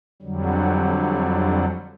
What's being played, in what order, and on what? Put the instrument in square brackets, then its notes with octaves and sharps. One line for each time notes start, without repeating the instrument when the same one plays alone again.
[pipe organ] F2 D3 F#3 G3